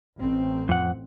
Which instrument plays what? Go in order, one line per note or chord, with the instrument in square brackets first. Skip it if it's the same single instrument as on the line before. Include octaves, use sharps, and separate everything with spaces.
[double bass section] A1 C4
[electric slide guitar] F2 F#5